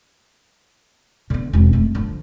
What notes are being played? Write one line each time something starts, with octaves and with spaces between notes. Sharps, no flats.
D3 B3
E1 C4
F2 A3
D3 F3